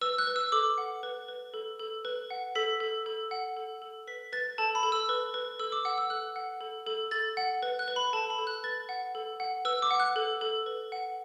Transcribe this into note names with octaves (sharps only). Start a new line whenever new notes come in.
B4 E6
F#6
B4
E6
A4 D6
F#5
B4
B4
A4
A4
B4
F#5
A4 B6
A4
A4
F#5
A4
A4
B4 B6
B4 A6
A4 A5
B5
A4
E6
B4
B4
A4 E6
D6
F#5 E6
E6
A4 F#6
F#5
A4
A4
A4 A6
F#5
B4
F#6
B4
B5
A4 A5
B5
A4
F#6
B4 A6
F#5
A4
F#5
B4 E6
D6
F#5
F#6
A4
A4
B4
F#5